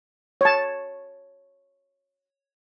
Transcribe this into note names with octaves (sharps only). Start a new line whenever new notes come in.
C#5 A5